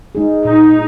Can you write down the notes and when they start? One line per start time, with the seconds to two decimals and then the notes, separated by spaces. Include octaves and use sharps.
0.15 G#3 D#4 G#4
0.45 A#2 D#4